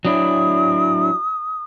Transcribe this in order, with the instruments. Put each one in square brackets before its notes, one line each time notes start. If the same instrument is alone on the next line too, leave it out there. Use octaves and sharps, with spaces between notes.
[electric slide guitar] F#3 D4 E4 [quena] D#6